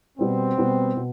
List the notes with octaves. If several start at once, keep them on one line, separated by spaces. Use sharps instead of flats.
B2 G3 B3 C4
B2 G3 B3
B2